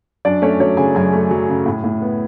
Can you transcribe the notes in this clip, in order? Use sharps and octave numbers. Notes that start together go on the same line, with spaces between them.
F#2 D4 D5
A3 C#4 C#5
F#3 C#4 C#5
C#3 G#4 G#5
F#2 G#4 G#5
A3
F#3
C#3
A2
A2
B3